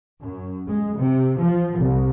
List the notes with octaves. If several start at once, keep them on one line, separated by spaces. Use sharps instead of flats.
F#2
G#3
C3
F3
C2